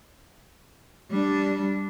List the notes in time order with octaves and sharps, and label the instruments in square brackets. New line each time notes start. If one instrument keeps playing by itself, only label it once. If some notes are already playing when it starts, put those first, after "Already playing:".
[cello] G3 D4